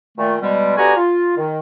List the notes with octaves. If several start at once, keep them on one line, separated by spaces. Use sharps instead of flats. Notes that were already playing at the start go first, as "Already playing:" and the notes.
A#2 D#3 A3
B2 G3 G#3
D3 B3 F#4 G4 G#5 A#5
F4
D#3